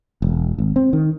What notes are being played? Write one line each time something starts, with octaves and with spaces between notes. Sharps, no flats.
E1
G#1
C4
D#3